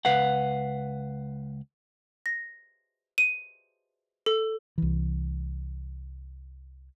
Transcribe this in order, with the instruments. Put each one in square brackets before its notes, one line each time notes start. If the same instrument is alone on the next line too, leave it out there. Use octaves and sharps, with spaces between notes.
[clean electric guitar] C#2 B4 F5 F#5
[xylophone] A#6
D#7
A4
[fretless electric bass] C2 E3